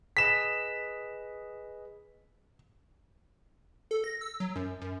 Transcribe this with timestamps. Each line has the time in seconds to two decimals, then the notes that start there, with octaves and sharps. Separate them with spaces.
0.17 G#4 B4 D#5 B6 E7
3.91 A4
4.04 A#6
4.21 E6
4.40 F#3
4.56 F#2
4.81 F#2